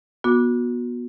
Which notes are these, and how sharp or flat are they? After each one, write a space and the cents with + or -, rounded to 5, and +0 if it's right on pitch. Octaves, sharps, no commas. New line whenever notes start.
B3 -25 F#4 -30 D6 +0